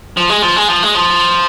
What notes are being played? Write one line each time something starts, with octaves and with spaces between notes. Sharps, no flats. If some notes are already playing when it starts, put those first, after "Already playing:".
F3
G#3
F3
G#3
F3
G#3
F3